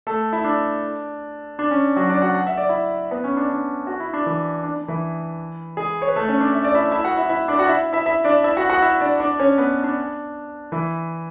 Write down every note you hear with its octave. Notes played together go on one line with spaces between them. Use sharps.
A3 A4
E4
D4
D4
C#4
F#3 F#4
D4 D5
F#4 F#5
F#5
E5
D5
E4 E5
B3 B4
C#4
D4
D4
F#4
E4
D4
E3 E4
D4
D4
E3 E4
G#3 G#4
C#5
B4
A3 A4
C#4 C#5
D4 D5
E5
D5
E4 E5
E4 E5
F#4 F#5
E4 E5
E4 E5
D4 D5
F#4 F#5
E4 E5
E4 E5
E4 E5
D4 D5
E4 E5
F#4 F#5
F#4 F#5
E4 E5
D4 D5
D4 D5
C#4 C#5
B3 B4
D4
E3 E4